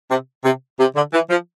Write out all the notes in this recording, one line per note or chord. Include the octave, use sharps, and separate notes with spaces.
C3
C3
C3
D3
E3
F3